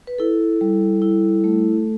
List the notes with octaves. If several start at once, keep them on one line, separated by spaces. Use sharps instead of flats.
B4
E4 A4
G3
E4
A3